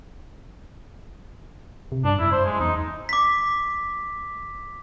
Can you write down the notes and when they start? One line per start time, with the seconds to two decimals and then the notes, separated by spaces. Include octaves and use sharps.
1.92 C3
2.05 G2 D4
2.19 F#2 E4
2.32 C5
2.45 G#3
2.60 E2 D#4
3.09 D6 B6